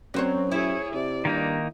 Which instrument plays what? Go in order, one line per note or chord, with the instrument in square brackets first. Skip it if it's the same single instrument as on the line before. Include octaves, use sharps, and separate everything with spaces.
[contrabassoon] F#2 [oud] F#3 C5 C#5 [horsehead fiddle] C4
[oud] E4 [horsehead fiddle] G#4 C#5
[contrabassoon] C3 [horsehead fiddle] D5
[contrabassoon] G2 [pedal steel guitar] D#3 A#3 D#4